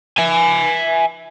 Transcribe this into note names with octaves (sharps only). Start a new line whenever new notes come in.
E5 G#5